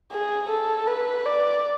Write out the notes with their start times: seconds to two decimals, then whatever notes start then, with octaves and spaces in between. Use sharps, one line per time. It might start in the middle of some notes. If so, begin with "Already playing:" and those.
0.12 G#4
0.49 A4
0.87 B4
1.25 D5